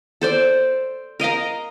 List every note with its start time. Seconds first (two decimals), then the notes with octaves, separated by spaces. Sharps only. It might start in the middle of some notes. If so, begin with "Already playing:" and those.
0.21 A4 C5 D5
1.20 A#4 D#5 F5 A#5